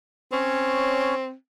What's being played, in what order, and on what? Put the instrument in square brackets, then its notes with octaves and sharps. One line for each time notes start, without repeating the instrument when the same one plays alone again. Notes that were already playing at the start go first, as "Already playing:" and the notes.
[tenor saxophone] C4 [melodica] C#4 C#5